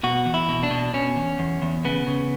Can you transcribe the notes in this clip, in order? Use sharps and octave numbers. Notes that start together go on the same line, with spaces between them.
B2 F#4
E2
E4
B2
D4
B2
B2 C#4
E2
E2
E2
C#3 B3
C#3